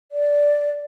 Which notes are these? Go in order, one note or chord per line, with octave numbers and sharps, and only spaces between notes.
D5